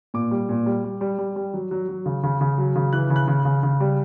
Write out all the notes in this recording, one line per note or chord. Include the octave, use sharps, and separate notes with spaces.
A#2 D6
G3
A#2
G3
G3
G3
G3
G3
F#3
F#3
F#3
C#3
C#3
C#3
F#3
C#3
E3 F#6
C#3
F#6
C#3
C#3
C#3
G3